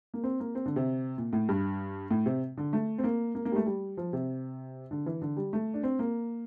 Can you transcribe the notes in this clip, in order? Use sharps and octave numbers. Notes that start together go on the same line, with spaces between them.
A#3
C4
A#3
C4
D3
C3
A#2
A2
G2
A2
C3
D3
A3
C4
A#3
A#3
A#3
G3
A3
G3
F3
C3
D3
E3
D3
G3
A3
D4
C4
A#3